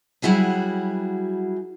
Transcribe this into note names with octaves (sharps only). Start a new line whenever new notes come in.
F#3 G3 E4 F#4 G#4